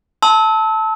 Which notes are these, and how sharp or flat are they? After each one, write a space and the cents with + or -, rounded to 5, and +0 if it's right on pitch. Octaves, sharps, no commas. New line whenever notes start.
A5 +0 C6 +0 E6 -30